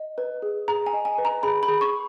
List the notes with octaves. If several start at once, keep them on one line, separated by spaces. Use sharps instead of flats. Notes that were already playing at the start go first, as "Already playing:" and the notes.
Already playing: D#5
B4
G#4
G#4 A#5
G#5
D#5
G#5
B4
A#5
G#4 B5
B5
G#4
C#6